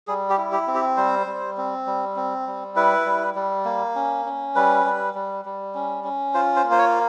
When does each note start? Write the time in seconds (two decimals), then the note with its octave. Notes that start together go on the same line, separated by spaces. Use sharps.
0.07 G3 G#4
0.30 G4
0.38 E4
0.52 G4
0.68 C4
0.75 G4
0.97 G3 C5
1.26 G3
1.57 C4
1.86 G3
2.16 C4
2.47 G3
2.76 E4 B4
3.06 G3
3.35 G3
3.65 A#3
3.95 C#4
4.25 C#4
4.55 G3 B4
4.85 G3
5.14 G3
5.45 G3
5.75 C#4
6.04 C#4
6.34 F4 C5
6.56 C5
6.64 A#3
6.71 C5
6.79 C#5